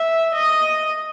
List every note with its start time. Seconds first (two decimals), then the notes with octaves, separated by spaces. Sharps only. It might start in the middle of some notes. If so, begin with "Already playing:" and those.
Already playing: E5
0.35 D#5